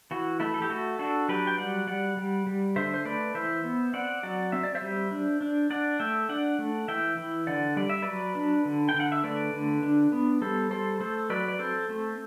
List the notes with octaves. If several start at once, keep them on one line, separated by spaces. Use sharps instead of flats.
E3 F#4
A3 E4
A4
G4
A3 F#4
D4 F#4 A4
F#3 G4 B4
G5
G3 D5 F#5
G3 D5 F#5
G3
G3
D3 C5 E5
C5
A3 B4 D5
E3 C5 E5
B3
C4 D5 F#5
F#3 D5 F#5
C4 E5
D5
C5 E5
G3
D4
D4
D4 D5 F#5
A3 E5 G5
D4 D5 F#5
A3
E3 E5 G5
E3
D3 D5 F#5
G3 D5
E5
F#3 B4 D5
D4
D3
G5
D3
F#5
E5
A3 B4 D5
D3
D4
B3
G3 A4 C5
G3 A4 C5
A3 A4 C5
F#3 B4 D5
D5
C4 A4 C5
A3